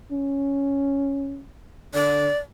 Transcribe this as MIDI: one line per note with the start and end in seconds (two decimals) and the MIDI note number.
0.12 1.44 61
1.94 2.29 50
1.94 2.38 74